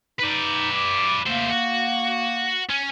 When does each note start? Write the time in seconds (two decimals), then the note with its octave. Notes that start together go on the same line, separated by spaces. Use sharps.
0.20 D#4 B4 D5
0.71 D6
1.26 A3 A#3 C5
1.50 F#4
2.70 C#4